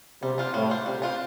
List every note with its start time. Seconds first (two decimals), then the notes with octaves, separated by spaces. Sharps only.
0.22 C3 G3
0.38 D4 F4 C5
0.54 A2 G3
0.70 D4 F4 C5
0.86 C3 G3
1.02 D4 F4 C5